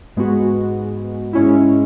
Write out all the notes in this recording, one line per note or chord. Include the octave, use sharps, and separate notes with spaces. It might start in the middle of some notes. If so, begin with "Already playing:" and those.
G#2 G#3 B3 F#4
G#2 G#3 C#4 E4